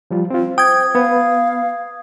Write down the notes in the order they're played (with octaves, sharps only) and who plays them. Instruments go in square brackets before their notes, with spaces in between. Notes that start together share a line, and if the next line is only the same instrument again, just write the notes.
[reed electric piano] F3 G3 F4
C4 F4
[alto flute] C5 [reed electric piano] G5 [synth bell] D#6 G#6
[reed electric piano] B3 B4 [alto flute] F5